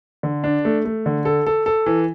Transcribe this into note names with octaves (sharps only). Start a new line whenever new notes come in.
D3
D4
A3
A3
D3
A4
A4
A4
E3